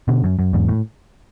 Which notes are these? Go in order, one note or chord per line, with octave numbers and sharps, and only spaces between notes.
B2 D3
F#2
F#2
E2 G#2
A2